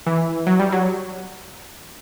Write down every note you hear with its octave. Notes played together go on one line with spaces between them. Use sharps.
E3
F#3
G3
F#3